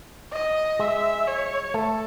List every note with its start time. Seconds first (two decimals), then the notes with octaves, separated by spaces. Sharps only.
0.33 D#5
0.79 G#3 E5
1.27 C#5
1.74 A3 A4